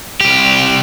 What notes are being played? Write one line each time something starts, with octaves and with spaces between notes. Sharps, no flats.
C2 G4